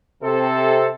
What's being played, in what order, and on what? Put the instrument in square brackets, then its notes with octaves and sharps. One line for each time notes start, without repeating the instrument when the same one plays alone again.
[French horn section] C3 [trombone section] C4 A4